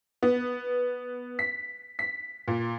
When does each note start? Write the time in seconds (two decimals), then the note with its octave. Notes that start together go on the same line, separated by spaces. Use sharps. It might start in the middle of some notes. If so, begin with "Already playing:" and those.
0.23 B3
1.39 B6
1.99 B6
2.48 A#2